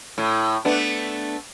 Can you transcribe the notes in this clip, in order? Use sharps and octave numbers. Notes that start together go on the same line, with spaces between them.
A2
A3 B3 D4